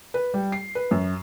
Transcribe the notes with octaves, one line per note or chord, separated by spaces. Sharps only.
B4
G3
C7
B4
F#2